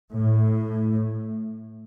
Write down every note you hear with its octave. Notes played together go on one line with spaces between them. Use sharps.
A2